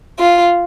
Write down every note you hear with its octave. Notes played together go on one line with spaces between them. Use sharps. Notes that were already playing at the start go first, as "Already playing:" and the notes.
F4